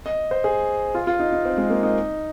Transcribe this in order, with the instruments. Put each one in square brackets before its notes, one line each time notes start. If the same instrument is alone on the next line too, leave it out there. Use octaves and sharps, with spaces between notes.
[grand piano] D#5
C5
G#4
F4
F4
D#4
D#4
C4
G#3
A#3
D#4